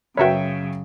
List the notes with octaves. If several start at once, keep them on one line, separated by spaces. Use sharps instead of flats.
F#2 C#3 F#4 A#4 B4 C#5 E5 G5